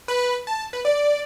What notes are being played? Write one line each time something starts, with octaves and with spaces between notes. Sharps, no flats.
B4
A5
B4
D5